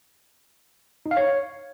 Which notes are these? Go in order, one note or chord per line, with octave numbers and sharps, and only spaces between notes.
D#4
F5
C#5